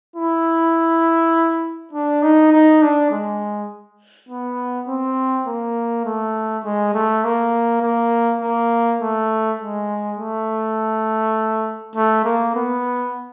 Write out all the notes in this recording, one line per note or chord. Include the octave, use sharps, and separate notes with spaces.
E4
D4
D#4
D#4
D4
G#3
B3
C4
A#3
A3
G#3
A3
A#3
A#3
A#3
A3
G#3
A3
A3
A#3
B3